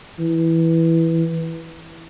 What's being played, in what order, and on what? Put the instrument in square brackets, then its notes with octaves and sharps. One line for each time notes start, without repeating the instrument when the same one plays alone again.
[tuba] E3